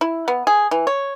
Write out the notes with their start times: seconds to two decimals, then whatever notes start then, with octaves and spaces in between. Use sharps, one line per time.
0.01 E4
0.28 B3
0.47 G#4
0.71 E3
0.87 C#5